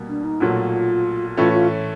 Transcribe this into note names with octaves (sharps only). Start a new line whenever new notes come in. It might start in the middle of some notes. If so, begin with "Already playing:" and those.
Already playing: C2 B2 G3 A#3
D4
D#4
B1 A#2 F#3 A3 F4
A2 E3 A3 C#4 F4
F4